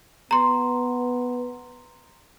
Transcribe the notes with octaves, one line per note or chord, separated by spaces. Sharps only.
B3 A#5 C6